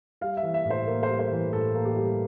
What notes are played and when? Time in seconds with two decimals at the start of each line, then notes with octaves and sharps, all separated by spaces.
0.21 G3 F5
0.37 E5
0.42 E3
0.54 E5
0.65 A2
0.70 C5
0.86 A#3 A#4
1.03 C5
1.08 G3
1.19 C5
1.30 E3
1.53 A2 A4
1.75 A#3
1.85 G4
1.96 G3